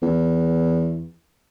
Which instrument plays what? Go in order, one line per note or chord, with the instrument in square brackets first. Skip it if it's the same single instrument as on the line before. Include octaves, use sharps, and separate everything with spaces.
[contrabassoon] E2